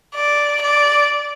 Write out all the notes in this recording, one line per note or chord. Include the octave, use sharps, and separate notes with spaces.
D5
D5